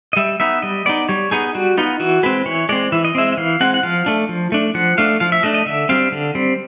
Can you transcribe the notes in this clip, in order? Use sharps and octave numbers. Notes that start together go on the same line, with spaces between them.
D#5
G3 E5
B3 D#4 E5
G3 D#5
B3 D#4 D5
G3 C#5
B3 D#4 G#4
G3 F#4
B3 D#4 F4
E3 F#4
G#3 C4 B4
E3 C#5
G#3 C4 D5
E3 E5
D#5
G#3 C4 E5
E5
E3 F5
G#3 C4 F#5
F#5
F3 F5
A3 D4
F3
A3 D4
F3 F#5
A3 D4 F5
F3 F5
E5
A3 D4 D#5
D#5
D3 E5
G3 C4 F5
D3
G3 C4